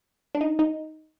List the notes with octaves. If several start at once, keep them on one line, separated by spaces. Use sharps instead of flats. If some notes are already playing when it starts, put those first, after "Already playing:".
D4
D#4
D#4